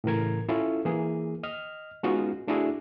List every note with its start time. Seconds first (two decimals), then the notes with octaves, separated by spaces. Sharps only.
0.04 A2 C#3 E3 A#4 G#6
0.49 C#4 E4 F4 A4
0.85 E3 A#3 G#4
1.43 D#5 F6
2.03 G#3 B3 C#4 D#4 F4 F#4
2.47 A3 D4 E4 F#4 G#4